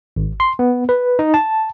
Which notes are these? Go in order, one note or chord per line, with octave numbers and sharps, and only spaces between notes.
G#1
C6
B3
B4
D#4
A5